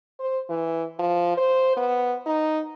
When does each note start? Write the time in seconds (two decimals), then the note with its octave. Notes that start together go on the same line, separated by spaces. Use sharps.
0.20 C5
0.49 E3
0.99 F3
1.37 C5
1.77 B3
2.26 D#4